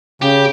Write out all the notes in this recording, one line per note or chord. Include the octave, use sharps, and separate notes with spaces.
C#3 G4